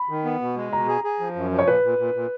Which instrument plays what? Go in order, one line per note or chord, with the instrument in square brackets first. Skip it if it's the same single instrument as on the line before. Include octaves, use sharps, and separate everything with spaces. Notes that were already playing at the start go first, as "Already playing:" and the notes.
Already playing: [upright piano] B5
[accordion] D#3
B3
B2
G#3
[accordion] B2 [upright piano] A#5
[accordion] G#4
G#4
F3
F#2
F3
[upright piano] C#5
[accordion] A#2 [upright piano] B4
[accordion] A#2
A#2
A#2